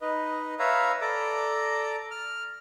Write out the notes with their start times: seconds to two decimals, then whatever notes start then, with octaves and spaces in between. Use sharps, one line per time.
0.01 D#4 B4 D#5
0.59 B4 C#5 E5 F5 A#5
1.01 A4 D5 A#5 D6
2.11 F6